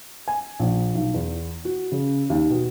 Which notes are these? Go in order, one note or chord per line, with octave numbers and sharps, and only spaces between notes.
G#5
A#1
B1
E2
F#4
C#3
D#2
B2